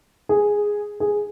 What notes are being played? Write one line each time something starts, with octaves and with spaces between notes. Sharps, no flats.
G#4
G#4